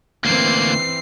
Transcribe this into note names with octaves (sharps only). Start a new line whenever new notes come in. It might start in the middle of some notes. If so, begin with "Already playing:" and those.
D2 E3 A#3 C4 C7